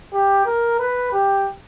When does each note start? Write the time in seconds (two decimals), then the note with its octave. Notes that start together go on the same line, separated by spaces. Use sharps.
0.14 G4
0.46 A#4
0.80 B4
1.13 G4